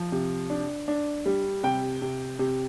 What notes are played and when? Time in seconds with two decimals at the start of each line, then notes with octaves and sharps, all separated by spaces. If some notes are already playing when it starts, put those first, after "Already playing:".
Already playing: F3
0.12 C3
0.50 D4
0.88 D4
1.26 G3
1.63 C3 G5
2.02 C3
2.39 C3